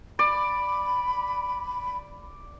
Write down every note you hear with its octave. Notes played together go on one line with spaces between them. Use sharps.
D5 B5